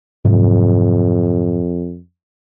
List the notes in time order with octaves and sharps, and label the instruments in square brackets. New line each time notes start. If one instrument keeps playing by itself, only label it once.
[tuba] F2 [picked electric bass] G#2 C3 F#3